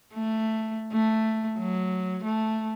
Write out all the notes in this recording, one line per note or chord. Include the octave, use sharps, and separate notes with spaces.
A3
A3
F#3
A3